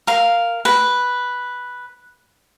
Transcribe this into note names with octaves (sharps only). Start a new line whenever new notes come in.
A#4 F5
B4